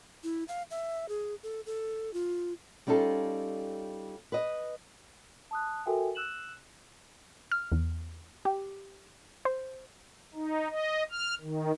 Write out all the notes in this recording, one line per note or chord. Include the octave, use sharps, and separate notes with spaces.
E4
F5
E5
G#4
A4
A4
F4
G3 C#4 D#4 F4 A4
B4 D#5
A5 D#6 F#6
F#4 A4 A#4 E5 G5 G#5
E6 F#6 E7 F#7
F6
E2
G4
C5
D#4
D#5
F6
D#3